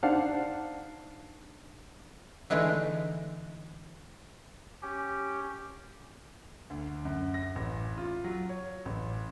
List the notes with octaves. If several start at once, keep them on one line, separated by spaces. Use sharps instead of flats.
D4 D#4 C5 F5 F#5 A5
D3 E3 G#3 A3 D4 D#4
C#4 G4
D2
F#2
A#6
A1
F4
F#3
C#5
A1